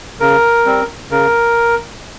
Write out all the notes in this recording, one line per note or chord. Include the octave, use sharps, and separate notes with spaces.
C#3 A#4
G3 C4
C#3 A#4